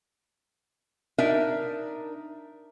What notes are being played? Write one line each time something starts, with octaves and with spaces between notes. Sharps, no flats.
D4 D#4 A#4 E5